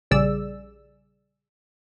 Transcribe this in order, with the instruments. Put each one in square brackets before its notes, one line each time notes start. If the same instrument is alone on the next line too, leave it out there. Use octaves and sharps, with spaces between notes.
[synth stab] A#1 C#3 G3 G#4 D5 E6